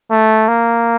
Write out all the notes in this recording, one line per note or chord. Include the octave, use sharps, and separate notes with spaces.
A3
A#3